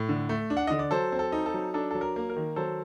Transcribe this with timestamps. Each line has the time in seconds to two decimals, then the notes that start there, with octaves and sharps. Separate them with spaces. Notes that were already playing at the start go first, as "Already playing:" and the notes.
Already playing: A2
0.09 D3
0.29 A3
0.50 D4
0.57 F#5
0.67 D3 D#5
0.79 D5
0.91 F#3 A4 C5
1.12 C4
1.19 A4
1.32 D#4
1.46 A4
1.54 F#3
1.74 D4 A4
1.91 F#3 A4
2.01 A#4
2.16 A#3
2.30 A#4
2.36 D#3
2.56 F#3 A4 C5